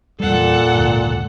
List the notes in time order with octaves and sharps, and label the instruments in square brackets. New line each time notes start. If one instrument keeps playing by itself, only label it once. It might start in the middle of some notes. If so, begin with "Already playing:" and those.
[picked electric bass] E2 G3 [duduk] A#2 [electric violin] A4 F#5
[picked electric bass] F#1 D2 G#2